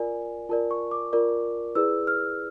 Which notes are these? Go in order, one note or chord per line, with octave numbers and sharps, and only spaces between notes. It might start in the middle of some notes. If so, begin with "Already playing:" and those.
Already playing: F4 A#4 D5 G#5
F4 A#4 D5 A5
C#6
D6
F4 A#4 D5
E4 G#4 B4 D5 E6
F6